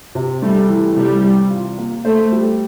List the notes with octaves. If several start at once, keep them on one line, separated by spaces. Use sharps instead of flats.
C3
G3 A3
E3
C3 G3
C3
F4
A#3
A3 C5
G3